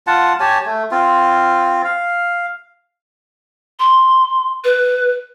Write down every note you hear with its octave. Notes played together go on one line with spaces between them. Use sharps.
F4 F#5 A5
G4 C#5 G#5 A5
A3
C4 F4
F5
C6
B4